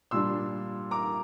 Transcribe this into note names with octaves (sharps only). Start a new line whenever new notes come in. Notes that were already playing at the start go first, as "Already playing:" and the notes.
A#2 G3 D4 C6 E6
A#5 D6